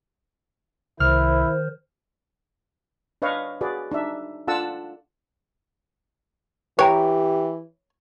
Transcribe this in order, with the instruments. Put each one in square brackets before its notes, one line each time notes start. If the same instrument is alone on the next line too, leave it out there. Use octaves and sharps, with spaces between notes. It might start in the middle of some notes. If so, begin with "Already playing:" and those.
[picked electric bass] C2 [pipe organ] D#3 C5 [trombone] E4 [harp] F6
[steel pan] D4 B4 C#5 D#5 F5
F#4 G#4 B4 D5
D4 D#4 E5
D4 F4 A4 F#5 A5 E6
[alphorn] E3 [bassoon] G4 [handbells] B4 G5 A#5 [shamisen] C#5